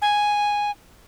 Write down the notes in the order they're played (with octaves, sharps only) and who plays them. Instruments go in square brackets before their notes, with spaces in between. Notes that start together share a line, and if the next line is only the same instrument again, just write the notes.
[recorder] G#5